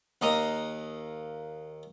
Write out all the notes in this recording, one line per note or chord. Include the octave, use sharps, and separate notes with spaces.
D#2 A#3 D#5 A#5